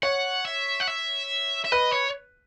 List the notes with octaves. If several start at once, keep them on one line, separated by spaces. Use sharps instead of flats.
C#5 F#5
E5
F#5
E5
E5
B4 D#5
C#5